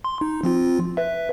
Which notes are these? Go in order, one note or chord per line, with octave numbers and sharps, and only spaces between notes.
C6
D#4
F3 C4 F4
B4 E5